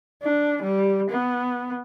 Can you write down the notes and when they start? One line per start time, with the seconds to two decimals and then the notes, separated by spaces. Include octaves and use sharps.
0.23 D4
0.63 G3
1.10 B3